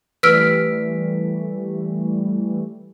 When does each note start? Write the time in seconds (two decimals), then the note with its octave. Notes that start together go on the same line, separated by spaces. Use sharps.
0.23 E3 G3 A3 B4 E6 F6 B6 D7